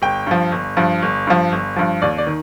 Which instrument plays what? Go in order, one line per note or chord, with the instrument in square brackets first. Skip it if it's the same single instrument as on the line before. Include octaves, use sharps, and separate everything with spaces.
[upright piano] G1 G5
G2 F3
G1
G2 F3
G1
G2 F3
G1
G2 F3
D#2 D5
D5
D#3